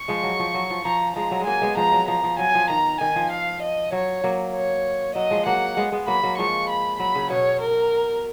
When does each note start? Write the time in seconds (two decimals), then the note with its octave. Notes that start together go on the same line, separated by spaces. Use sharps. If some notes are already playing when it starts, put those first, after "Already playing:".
Already playing: C#6
0.08 F3 G#3
0.23 F#3
0.39 F3
0.54 F#3
0.70 F3
0.85 F3 A#5
1.16 F3 G#3 A#5
1.31 F#3
1.40 G#3
1.46 F#3 A#3 G#5
1.62 G#3 B3
1.77 F3 G#3 A#5
1.93 F#3
2.08 F3 A#5
2.23 F3
2.39 F#3 G#5
2.55 F3
2.69 D#3 A#5
3.00 D#3 G#5
3.16 F3
3.31 F5
3.62 D#5
3.92 F#3 C#5
4.24 F#3 A#3
4.54 C#5
5.15 F#3 D#5
5.31 F3 G#3
5.46 F#3 A#3 F#5
5.77 G#3 B3
5.92 G#3 B3
6.07 F#3 A#3 B5
6.23 F#3 A#3
6.38 F3 G#3 C#6
6.69 B5
6.99 F#3 B5
7.15 C#3
7.30 B2 C#5
7.61 A#4